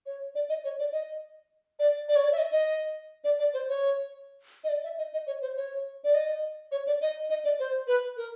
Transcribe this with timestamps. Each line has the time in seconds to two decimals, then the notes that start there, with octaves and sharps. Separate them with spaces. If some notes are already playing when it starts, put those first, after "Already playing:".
0.06 C#5
0.35 D5
0.49 D#5
0.64 C#5
0.79 D5
0.92 D#5
1.79 D5
2.09 D5
2.16 C#5
2.24 D5
2.32 E5
2.38 D#5
2.52 D#5
3.24 D5
3.40 D5
3.54 C5
3.69 C#5
4.64 D#5
4.69 D5
4.84 E5
4.98 D#5
5.13 D#5
5.27 C#5
5.42 C5
5.56 C#5
6.04 D5
6.15 D#5
6.72 C#5
6.87 D5
7.01 D#5
7.30 D#5
7.44 D5
7.59 C5
7.87 B4
8.17 A#4